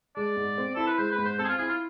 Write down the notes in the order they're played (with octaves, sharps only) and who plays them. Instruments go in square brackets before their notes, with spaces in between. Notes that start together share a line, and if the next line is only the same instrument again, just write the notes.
[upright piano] G#3 [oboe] D5
[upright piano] G#2
C4
[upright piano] E4 [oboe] A4
[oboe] B4
[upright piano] G#3 [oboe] C5
[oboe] B4
[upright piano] G#2
[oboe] C5
[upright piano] C4 [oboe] A4
[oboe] G#4
F4
[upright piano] E4 [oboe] G#4
[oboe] F4